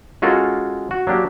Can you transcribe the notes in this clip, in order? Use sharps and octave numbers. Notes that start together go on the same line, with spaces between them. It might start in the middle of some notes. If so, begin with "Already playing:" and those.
G#3 C#4 F4 F#4 A4 A#4
F#4
F#3 A#3 D4 G4